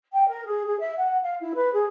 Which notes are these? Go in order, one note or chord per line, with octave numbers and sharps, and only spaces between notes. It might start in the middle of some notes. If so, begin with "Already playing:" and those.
G5
A#4
G#4
G#4
E5
F#5
F5
E4
B4
G#4